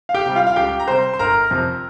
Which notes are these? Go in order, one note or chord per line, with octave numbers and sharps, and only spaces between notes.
F5
G4 G5
C3 G3
F4 F5
F5
C#2 G4 G5
A#5
C3 G3 C5 C6
C6
G1 A#4 A#5
F2 C3 F3